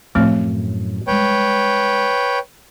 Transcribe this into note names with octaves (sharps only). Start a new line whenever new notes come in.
F#2 A2 F3 A3 C4
G3 G#3 B4 C#5 G5